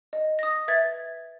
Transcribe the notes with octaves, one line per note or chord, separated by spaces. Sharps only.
D#5
D#6 A#6
B4 E5 G#6 A6